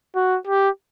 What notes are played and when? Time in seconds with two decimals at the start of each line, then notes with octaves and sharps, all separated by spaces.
0.16 F#4
0.47 G4